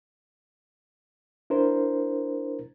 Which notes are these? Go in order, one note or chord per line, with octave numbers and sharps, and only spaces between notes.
D4 E4 A#4 C5